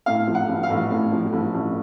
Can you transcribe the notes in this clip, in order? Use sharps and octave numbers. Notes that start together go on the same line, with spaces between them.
A2 F5
F3
F#5
A1
F5
A1
A2
F3
A1
A1